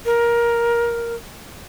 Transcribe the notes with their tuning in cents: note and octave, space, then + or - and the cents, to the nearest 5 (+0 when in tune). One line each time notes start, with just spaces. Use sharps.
A#4 +15